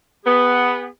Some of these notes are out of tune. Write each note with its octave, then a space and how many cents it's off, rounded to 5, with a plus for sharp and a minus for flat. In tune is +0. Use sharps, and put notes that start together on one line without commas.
B3 +0 G#4 -40